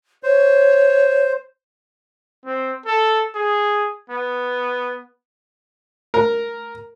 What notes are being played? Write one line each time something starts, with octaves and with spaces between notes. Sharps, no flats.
C5 C#5
C4
A4
G#4
B3
A#4